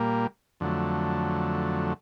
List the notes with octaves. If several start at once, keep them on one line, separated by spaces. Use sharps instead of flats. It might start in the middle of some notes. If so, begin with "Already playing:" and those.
Already playing: A#2 G3 A#3
F2 D3 F#3 A3